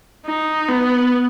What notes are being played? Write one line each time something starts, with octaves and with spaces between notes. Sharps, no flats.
D#4
B3